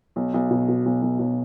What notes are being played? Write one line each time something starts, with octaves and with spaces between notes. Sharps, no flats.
B1
B1
B2
B2
B1
B1
B1